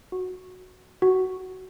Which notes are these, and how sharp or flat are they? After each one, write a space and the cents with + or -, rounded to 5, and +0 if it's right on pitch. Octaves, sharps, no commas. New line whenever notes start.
F#4 -5
F#4 +15